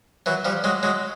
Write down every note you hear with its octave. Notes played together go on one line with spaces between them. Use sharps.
E3 F#3
F3 G3
F#3 G#3
F#3 G#3